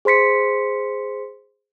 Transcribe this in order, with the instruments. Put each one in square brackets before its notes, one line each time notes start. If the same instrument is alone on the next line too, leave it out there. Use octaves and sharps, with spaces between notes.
[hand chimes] G#4 C5 C6 B6 C#7